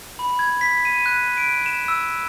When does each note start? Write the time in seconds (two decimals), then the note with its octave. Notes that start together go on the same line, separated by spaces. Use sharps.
0.19 B5
0.39 G#6
0.61 B6
0.85 D#7
1.06 F#6
1.37 D7
1.66 E7
1.88 E6